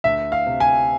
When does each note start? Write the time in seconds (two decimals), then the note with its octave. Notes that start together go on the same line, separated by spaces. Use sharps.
0.04 D2 E5
0.32 F5
0.46 C3
0.60 G#5